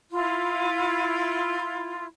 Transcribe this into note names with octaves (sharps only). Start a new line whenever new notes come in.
E4 F4